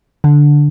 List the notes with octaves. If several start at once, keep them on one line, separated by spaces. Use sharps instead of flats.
D3